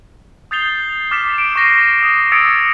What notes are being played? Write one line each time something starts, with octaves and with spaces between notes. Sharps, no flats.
D#6 G6 A6 C7 F7 G7
D6 F6 A6 B6 C#7 E7
D7
C#6 F#6 A#6 C7 D#7
D#6
D#6 E6 G#6 A6 C#7 D7